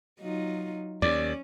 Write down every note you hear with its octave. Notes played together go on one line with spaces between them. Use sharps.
F#3 D#4 F4
D#2 C#4 D5